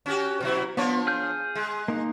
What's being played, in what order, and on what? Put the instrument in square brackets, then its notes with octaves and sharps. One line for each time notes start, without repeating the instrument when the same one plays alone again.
[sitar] C#4 F#4 G4
B2 F#3 E4
[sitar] F3 D4 C#5 [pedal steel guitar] B3
[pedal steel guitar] G#4 F6 G6
[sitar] G#3
[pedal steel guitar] A#3 D#4